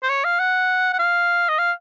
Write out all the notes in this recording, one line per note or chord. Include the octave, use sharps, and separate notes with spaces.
C5
C#5
F5
F#5
F#5
F5
D#5
F5